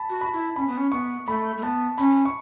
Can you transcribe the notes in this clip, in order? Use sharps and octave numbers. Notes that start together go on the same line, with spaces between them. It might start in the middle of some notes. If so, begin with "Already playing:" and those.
Already playing: A5 B5
F#4
B5
E4
C#4 B5
B3
C#4
B3 C#6
A3 B5
A3
B3 A5
C#4 B5
C#6